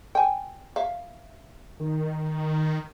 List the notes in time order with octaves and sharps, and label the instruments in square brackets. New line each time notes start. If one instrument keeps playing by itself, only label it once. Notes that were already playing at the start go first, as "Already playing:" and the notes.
[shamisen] G5 G#5
E5 F5
[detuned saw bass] D#3